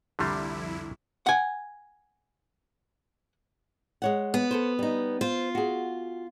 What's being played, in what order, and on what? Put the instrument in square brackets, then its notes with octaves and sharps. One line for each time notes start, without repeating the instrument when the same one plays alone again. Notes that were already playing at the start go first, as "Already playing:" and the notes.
[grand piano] C2 C6 [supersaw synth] F2 E4 [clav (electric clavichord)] D3 G3
[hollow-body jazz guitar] F#5 G#5
[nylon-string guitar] G#3 C#5 F#5
[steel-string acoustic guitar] B3
[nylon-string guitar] A4 B4 C5
G3 D#4
[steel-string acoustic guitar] F4 [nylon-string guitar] C5
[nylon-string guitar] F#4 G#4